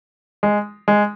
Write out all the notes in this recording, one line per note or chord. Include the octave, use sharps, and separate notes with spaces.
G#3
G#3